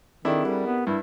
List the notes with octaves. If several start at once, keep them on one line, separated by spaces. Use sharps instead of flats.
D#3 C4 D4 E4 G#4 A4
G3 G4 A#4 F#5
B3
G2 E4